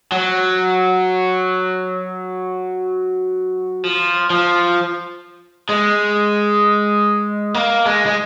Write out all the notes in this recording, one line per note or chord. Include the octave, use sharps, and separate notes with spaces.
F#3
F3
F3
G#3
A#3
G#3
G#3